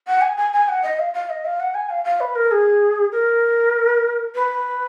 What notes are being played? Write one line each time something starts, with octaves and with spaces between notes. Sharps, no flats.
F#5
G#5
G#5
G#5
F#5
D#5
F5
F5
D#5
F5
F#5
G#5
F5
F5
B4
A#4
G#4
A#4
B4